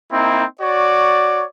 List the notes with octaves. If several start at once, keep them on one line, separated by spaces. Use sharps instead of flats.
A#3 C4 D#4 E4
F#4 C#5 D5